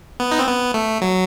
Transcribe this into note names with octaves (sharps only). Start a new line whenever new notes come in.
B3
D#4
C4
B3
A3
F#3